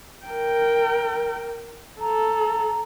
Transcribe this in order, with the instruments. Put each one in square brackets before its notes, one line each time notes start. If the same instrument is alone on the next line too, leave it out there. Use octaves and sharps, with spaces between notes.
[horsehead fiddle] A#4 G5
[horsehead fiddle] A4 [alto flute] A#5